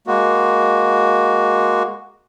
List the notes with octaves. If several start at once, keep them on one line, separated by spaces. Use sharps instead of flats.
G#3 A#3 F#4